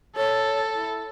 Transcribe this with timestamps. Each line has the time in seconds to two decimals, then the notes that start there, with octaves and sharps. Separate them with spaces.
0.16 A4 C#5
0.74 E4